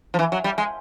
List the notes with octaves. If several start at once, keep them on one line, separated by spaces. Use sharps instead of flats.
F3
E3
F#3
G3
G#3